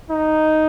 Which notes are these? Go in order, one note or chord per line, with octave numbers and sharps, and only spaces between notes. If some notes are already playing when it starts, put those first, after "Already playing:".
D#4